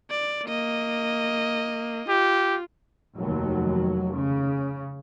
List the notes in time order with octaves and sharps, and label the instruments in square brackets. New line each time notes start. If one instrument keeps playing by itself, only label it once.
[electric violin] D5
A#3 D#5
[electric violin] F4 [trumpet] G4
[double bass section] F1 D#2 F#3
C#3